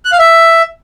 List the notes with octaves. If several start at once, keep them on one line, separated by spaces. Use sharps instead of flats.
F#6
F5
E5